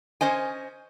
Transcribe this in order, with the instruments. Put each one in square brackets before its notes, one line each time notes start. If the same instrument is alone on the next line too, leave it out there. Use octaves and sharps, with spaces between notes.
[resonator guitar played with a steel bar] C#4 C5 D#5 G#5